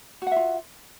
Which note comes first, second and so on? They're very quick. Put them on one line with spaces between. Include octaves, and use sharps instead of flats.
F#4 F#5 E5 F4